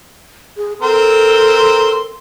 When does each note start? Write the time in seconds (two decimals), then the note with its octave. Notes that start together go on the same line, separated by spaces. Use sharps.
0.57 G#4
0.82 C4 A4 A#4 C6